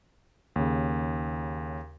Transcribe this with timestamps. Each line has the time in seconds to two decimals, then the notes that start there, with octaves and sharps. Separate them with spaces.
0.56 D#2 C#3